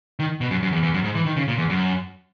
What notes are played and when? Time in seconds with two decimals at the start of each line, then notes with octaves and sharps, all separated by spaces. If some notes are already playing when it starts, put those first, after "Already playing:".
0.19 D#3
0.41 B2
0.51 F#2
0.63 F#2
0.72 E2
0.83 E2
0.94 F#2
1.04 G#2
1.15 E3
1.26 D#3
1.37 C#3
1.48 A#2
1.58 E2
1.70 F#2